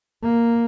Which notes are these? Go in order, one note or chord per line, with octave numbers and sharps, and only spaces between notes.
A#3